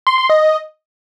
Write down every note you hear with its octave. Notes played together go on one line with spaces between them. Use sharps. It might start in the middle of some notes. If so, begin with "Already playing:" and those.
C6
C6
D#5